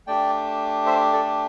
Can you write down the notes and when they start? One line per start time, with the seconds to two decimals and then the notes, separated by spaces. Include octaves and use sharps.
0.07 A3 D4 G4 D5 G5
0.86 C5 E5
1.13 A4 D5